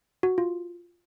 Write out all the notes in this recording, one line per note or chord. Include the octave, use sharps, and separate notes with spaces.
F#4
F4